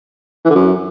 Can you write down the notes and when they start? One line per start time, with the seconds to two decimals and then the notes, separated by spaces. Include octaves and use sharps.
0.45 E3
0.50 D3
0.55 F#2